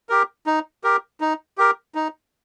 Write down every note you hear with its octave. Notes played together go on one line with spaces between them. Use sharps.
G4 A#4
D#4
G4 A#4
D#4
G4 A#4
D#4